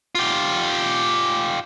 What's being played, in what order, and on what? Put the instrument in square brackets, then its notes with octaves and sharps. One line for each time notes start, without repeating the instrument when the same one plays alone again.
[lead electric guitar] F4 G4